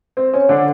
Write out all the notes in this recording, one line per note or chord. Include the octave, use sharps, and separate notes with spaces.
C4
C#4
D3 D4